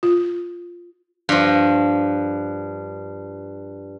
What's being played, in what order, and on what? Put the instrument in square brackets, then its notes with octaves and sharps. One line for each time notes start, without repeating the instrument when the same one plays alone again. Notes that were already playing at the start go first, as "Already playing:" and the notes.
[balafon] F4
[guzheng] G2 F3